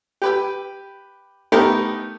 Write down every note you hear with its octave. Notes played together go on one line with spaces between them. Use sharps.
G4 B4 G5
A3 B3 D#4 G4 A#4